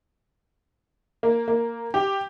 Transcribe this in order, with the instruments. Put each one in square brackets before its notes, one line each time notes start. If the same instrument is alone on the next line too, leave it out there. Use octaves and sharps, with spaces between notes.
[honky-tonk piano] A#3
A#3
G4